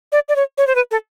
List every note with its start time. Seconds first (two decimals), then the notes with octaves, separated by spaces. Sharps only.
0.12 D5
0.29 D5
0.36 C#5
0.58 C#5
0.67 C5
0.75 B4
0.91 A4